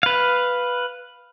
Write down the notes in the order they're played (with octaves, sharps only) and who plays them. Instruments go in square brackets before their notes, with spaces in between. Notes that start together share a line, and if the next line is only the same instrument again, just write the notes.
[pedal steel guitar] B4 F5